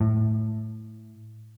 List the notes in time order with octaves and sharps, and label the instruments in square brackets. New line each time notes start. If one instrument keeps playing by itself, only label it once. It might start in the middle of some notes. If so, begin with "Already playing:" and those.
[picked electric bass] A2